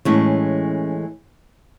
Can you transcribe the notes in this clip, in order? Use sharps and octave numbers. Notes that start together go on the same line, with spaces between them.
A2 E3 G#3 C#4 C#5